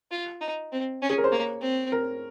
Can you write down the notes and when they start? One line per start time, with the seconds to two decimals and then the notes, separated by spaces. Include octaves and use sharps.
0.11 F4
0.41 D#4
0.72 C4
1.02 C#4
1.10 G#4
1.18 A#4
1.24 C5
1.32 A#3 C#5
1.61 C4
1.92 A#4